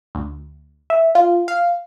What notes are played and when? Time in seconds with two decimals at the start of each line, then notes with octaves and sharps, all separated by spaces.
0.15 D2
0.90 E5
1.15 F4
1.48 F5